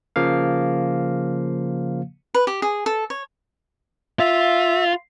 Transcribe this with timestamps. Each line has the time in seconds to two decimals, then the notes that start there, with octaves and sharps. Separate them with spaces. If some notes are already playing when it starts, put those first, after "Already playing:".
0.16 C#3 F3 A#3 F5
2.34 B4
2.47 G4
2.62 G#4
2.86 A4
3.10 C#5
4.20 F4 E5